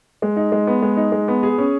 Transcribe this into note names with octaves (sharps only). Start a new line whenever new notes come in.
G#3
D#4
G#3
B3
G#3
D#4
G#3
B3
G#4
C#4